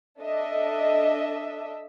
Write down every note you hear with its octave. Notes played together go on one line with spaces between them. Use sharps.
D4 A4 D#5 E5